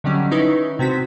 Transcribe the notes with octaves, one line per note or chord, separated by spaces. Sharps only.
D3 D#3 F#3 G3 C#4
D#3 C#4 D#4 E4 B4
C3 C4 F#4 B6